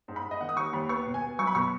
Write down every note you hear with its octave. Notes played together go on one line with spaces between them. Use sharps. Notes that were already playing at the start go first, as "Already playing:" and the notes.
G#2
B5
G#2
D#5
D#3 F#5
D#6
D#2 C#6
D#2 B5
B3 C#6
B2
G#5
B3
F#3 C#6
B5
B2 C#6